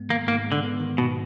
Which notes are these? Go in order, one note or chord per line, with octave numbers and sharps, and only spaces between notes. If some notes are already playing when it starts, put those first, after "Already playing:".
Already playing: G#2 G#3 B3
D#3 A#3
G#2 A#3
G#3
D3
B3
D#3
G#2 B2